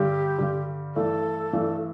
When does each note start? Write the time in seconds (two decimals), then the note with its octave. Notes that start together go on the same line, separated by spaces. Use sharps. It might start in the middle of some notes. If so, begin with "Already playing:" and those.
Already playing: G2 D3 G3 G4
0.39 G2 D3 G3
0.96 G2 E3 A3 D4 A4
1.53 G2 E3 A3 D4